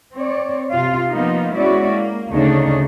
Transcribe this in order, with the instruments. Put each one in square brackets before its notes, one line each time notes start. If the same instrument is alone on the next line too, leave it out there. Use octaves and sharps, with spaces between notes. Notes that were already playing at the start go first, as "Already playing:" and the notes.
[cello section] C4 C#5 D5
C3 F4 F5
F3 A#3 B3 D#4 F4
G#3 B3 C#4 E4 F#4 D5
A#3
D2 C#3 A3 D4 D#4 C#5